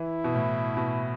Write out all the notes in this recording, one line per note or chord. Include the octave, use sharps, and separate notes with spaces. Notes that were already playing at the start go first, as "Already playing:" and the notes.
Already playing: E3 E4
B2
A2
B2